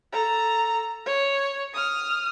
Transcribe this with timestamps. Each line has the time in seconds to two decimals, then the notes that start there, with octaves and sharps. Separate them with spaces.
0.12 A4 A#5
1.06 C#5
1.73 D#6 F6